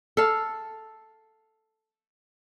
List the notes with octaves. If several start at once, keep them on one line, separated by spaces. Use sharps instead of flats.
A4 F5